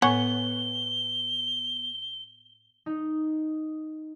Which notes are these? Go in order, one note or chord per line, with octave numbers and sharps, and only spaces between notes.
A2 B3 C#5 F#5 G#5 G7
D#4